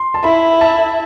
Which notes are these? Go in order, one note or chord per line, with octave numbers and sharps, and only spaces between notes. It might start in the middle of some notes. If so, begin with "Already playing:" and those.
Already playing: C6
A5
E4 B5
A5